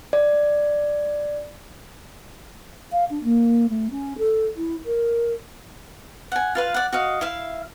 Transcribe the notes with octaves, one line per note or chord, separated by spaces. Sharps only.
D5
F5
D4
A#3
A3
C#4
A4
E4
A#4
F#5 G#5
F4 B4 F5
D5 F#5
F#4 D#5 F5
E4 E5 F5